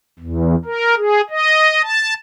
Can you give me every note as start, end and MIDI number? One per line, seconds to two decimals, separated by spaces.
0.19 0.56 40
0.65 0.95 70
0.97 1.21 68
1.30 1.82 75
1.82 2.14 81